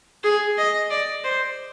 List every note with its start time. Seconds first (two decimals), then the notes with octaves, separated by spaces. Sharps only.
0.24 G#4
0.58 D#5
0.90 D5
1.24 C5